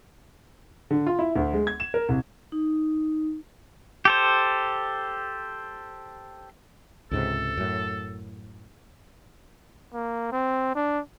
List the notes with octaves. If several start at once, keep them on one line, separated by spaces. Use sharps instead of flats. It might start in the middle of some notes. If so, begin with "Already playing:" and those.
D3
F4
E4
D2
G#3
G#6
E7
A#4
C2
D#4
G4 A4 C5
C#2 G#2 C3 A4
F#2 A2
A#3
C4
D4